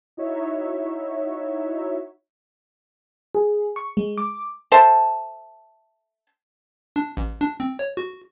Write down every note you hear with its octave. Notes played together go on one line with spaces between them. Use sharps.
D#4 E4 F#4 C#5 E5
G#4
C#6
G#3
D6
A4 C5 E5 A5
D4
A1
D4
C4
C#5
F#4